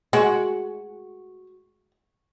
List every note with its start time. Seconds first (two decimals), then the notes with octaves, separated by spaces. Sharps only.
0.13 G#3 F#4